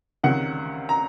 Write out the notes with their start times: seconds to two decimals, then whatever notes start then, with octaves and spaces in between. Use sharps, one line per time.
0.23 C#2 C3 D#3 F#5
0.89 A#5